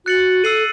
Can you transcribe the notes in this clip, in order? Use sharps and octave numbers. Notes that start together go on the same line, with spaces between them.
F#4 F#6 A6 C#7 F#7
A4 E6 C7 D#7 F#7